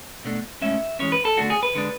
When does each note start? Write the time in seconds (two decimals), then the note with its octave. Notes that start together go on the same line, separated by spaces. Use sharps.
0.25 B2 A3 D4
0.62 A2 G#3 C#4 E5
0.99 E3 G#3 C#4 C#5
1.12 B4
1.25 A4
1.37 D3 A3 D4 F#4
1.50 G#4
1.63 B4
1.75 D3 G#3 D4